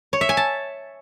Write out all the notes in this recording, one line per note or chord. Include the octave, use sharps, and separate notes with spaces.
C#5
E5
G#5
A5